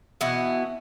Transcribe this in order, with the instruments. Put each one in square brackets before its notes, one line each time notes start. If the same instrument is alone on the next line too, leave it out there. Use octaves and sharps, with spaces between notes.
[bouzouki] B2 E3 B3